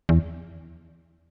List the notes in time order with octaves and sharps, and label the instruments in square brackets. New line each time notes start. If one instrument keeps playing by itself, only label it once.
[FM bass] E2